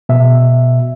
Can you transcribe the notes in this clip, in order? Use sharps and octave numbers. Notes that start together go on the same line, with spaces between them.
B2 E5